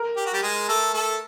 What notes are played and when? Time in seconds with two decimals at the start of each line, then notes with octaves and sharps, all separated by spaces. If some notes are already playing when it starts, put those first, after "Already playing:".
Already playing: A#4
0.17 G4
0.26 F#4
0.33 G3 G4
0.42 G#3 G#4
0.68 A3 A4
0.94 A3 A4